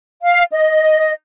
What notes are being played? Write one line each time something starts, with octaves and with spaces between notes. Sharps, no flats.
F5
D#5